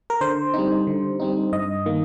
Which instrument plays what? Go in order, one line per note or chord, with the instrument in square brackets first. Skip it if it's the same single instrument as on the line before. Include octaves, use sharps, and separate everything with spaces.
[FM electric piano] A#4
D3 C5
G3 C4 D#4
D3
G3 C4 D#4
G2 D#5
D#3 A#3